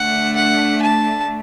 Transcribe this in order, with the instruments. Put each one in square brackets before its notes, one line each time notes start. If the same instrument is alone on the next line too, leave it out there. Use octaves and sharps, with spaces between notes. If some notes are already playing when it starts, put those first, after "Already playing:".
Already playing: [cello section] D3 A3 D4 [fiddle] F#5
[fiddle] F#5
A5